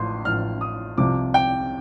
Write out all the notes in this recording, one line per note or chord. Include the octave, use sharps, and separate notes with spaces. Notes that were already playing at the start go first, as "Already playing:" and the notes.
Already playing: A1 A2 F3 C6
A1 A2 F3 F6
D#6
C2 C3 F3 D6
G5